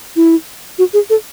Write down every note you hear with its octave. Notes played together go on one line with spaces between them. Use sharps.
E4
F#4
G#4
A4